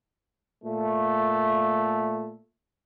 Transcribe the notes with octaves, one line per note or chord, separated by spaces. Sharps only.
A#2 A3